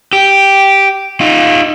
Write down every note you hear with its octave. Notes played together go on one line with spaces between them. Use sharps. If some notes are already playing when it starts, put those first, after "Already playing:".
G4
D#4 F4